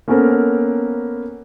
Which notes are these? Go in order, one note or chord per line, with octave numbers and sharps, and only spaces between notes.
A#3 B3 C#4 A4 A#4 C5